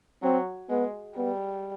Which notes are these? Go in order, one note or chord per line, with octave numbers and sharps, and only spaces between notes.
F#3 C4
G#3 B3
G3 B3